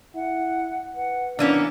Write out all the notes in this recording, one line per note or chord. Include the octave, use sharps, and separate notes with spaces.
E4 F#5
B4 F#5
E3 A#3 B3 C#4 D4